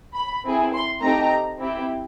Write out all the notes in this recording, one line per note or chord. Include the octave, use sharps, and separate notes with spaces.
B5
C4 E4 G#4
C6
A3 C4 D#4 G4 A#5
C4 E4 G4